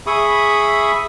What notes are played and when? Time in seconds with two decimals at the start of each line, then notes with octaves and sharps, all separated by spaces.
0.07 G#4 E5 B5 C#6 D#6